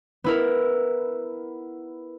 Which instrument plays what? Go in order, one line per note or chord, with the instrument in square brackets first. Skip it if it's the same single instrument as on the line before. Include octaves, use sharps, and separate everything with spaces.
[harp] B3 E4 A#4